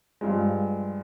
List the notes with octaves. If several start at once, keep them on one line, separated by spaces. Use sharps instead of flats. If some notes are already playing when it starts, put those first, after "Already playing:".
G2 F3 G#3